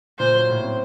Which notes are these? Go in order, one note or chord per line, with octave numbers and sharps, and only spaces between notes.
A#2 C5
F#3
A2
C4